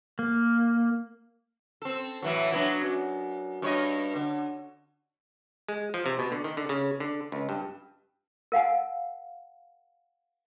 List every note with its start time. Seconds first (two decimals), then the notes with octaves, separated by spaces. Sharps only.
0.19 A#3
1.82 C4 A4
2.22 A2 E3 F#3
2.52 F#3 B3 D4
2.82 F#2
3.62 G2 C#5 D#5
4.15 D3
5.69 G#3
5.94 F3
6.06 C3
6.19 B2
6.32 D3
6.44 D#3
6.57 D3
6.69 C#3
7.00 D3
7.32 C#2
7.49 G2
8.52 A#4 F5 F#5 G#5